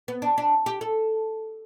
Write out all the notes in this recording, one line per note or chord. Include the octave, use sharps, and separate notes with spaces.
B3
D4
D4
G4
A4